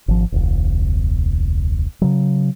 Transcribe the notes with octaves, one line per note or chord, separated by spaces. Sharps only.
G#1 F3
E1 C#2
C#3 F#3